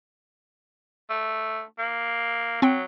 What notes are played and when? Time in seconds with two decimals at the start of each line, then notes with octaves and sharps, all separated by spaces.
1.10 A3
1.79 A#3
2.62 F#3 C4 G5